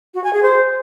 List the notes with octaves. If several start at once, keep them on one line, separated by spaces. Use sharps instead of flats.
F#4
G#5
G#4
C5